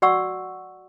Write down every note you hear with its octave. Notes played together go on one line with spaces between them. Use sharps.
F#4 D5 F#5 C#6 E6